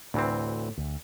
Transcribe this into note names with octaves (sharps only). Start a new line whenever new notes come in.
D2 A2 E3 C4
D2